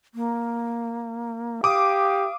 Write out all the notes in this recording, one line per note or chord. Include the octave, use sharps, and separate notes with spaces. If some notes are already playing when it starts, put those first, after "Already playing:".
A#3
G4 F5 D6 D#6